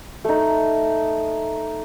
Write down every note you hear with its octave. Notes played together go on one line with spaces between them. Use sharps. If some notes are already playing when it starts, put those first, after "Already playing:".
A3 D#4